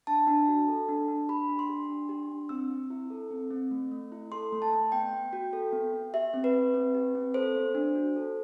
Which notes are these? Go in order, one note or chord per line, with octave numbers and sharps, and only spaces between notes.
D4 A5
D4
F#4
A4
D4
D4
G4 B5
D4
C6
G4
D4
G4
D4
C4 E6
C4
E4
A4
C4
C4
A3
A3
E4
A4 C6
A3
A5
A3
B3 G5
B3
F#4
A4
B3
B3
G4 E5
C4
B4
G4
C4
G4
C4
A4 C5
B3
D4
F#4
A4